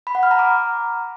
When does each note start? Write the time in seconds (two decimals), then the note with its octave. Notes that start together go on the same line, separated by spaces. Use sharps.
0.07 B5
0.15 F#5
0.23 F6
0.31 A#5
0.39 D6